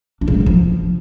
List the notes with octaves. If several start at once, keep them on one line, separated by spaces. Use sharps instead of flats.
D4
C#3
G#3
B3
F3